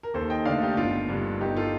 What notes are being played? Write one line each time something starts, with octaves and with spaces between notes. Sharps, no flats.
A#4
D#2 A4 C5
D#5 G5
D3 A3 D5 F5
D#4 G4
G1 D4 F4
G2 D3
G1 D#4 G4
F4 A4